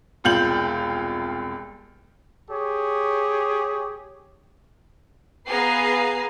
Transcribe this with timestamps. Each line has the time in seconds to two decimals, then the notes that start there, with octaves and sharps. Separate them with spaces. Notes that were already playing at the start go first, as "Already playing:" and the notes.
0.24 E1 C2 F4 G6 F#7
2.50 G4 G#4 C#5
5.50 B3 G#4 B4 F5 A#5 C7